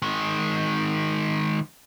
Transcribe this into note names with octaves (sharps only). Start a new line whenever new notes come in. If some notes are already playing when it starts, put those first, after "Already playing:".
D#3 G#3